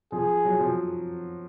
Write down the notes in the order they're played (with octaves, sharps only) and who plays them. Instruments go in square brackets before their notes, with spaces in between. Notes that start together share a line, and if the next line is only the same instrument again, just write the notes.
[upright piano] F3 [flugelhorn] G#4
[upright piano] F#3
F3